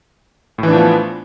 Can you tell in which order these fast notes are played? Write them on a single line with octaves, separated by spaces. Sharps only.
A2 E3 D4 F3 B3